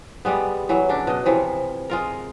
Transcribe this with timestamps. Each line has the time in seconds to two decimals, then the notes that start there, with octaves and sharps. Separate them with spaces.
0.25 G3 G#3 B3
0.69 E3 F#3
0.89 C#3 D4
1.07 B2 D#5
1.26 C3 E3 F3
1.90 G#3 F4 A#4